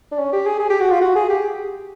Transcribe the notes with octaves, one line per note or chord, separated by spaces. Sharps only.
D4
C#4
G4
G#4
G#4
G4
F#4
F4
F#4
G#4
G4